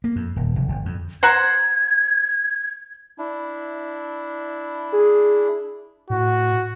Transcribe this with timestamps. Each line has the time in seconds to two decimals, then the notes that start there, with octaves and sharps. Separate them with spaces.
0.04 A#3
0.16 F2
0.36 D#1
0.56 F1
0.68 G1
0.85 F2
1.23 C5 F#5 A#5 G#6
3.18 D4 E4
4.92 G#4
6.10 A2 F#4